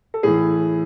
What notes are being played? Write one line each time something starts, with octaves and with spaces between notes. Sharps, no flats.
A4
A2 E3 G#4